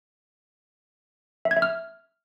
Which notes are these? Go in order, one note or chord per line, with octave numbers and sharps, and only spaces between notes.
E5
G#6
E5
F6